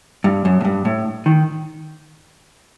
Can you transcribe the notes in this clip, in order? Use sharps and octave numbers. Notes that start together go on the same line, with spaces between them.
G2
F#2
A2
G2
A2
D#3